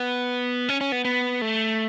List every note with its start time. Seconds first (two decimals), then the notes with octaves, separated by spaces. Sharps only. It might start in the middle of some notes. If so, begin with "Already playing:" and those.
Already playing: B3
0.69 C#4
0.81 C#4
0.92 B3
1.05 B3
1.42 A3